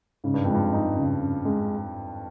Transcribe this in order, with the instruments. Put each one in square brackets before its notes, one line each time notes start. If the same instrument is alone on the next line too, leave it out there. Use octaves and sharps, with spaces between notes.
[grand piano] G#2 [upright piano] C#3
[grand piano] G2
[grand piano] F2 [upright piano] G#3
[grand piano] G2
[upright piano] D#4
C#3
C#3
G#3